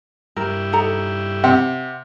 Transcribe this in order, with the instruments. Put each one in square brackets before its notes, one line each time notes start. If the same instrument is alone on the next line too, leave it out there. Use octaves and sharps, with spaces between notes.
[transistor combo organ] G2 G3 E4 [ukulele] A#4
[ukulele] D#4 A4 A#5
[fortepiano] C3 [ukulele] F#5